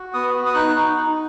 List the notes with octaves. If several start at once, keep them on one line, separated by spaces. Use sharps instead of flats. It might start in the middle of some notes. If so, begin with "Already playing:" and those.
Already playing: F#4
B3 D#6
F#4
D#6
D#4 F#6
D#4
D#4